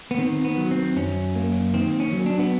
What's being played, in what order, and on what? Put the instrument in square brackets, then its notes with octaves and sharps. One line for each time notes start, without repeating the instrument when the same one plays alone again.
[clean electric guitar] B3
D#3 C4
B3
F#3
C4
F#2 C#4
A#3
D#3 C4
C#4
F#3
D4
B3